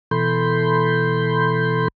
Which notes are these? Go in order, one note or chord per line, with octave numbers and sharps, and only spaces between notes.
B2 E3 A4 B5 C6 G6